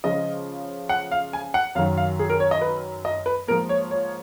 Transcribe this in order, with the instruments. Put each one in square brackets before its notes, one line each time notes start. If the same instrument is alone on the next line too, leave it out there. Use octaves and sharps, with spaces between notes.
[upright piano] C#3 F3 G#3 D#5
F#5
F5
G#5
F#5
F#2 D#3 F#3 F5
F5
G#4
A#4
C#5
D#5
B4
D#5
B4
G#2 F3 A#3 A#4
C#5
C#5